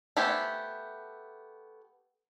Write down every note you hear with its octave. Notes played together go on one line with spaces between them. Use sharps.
A3 B3 G4 C5 G#5